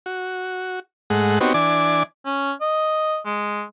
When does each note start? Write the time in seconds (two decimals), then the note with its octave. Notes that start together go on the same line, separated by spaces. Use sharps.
0.06 F#4
1.10 G#2 G#3 A3 F#5
1.41 B3 C4 D#4 F#4 G4 C#5
1.54 E3 D4 D5 G#5 D6
2.26 C#4
2.61 D#5
3.26 G#3